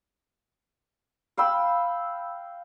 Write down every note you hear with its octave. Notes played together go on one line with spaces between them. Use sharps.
F5 G5 B5 E6